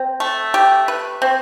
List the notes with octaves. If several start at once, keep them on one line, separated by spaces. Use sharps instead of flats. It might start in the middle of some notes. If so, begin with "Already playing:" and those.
Already playing: C4
A3
G4
B4
C4